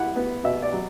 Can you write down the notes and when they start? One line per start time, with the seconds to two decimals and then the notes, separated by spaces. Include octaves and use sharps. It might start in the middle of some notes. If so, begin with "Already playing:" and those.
Already playing: E4 F#5
0.16 B3
0.44 B2 E5
0.62 D5
0.72 F#3